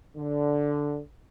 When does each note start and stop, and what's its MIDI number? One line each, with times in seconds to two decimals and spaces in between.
0.16 0.97 50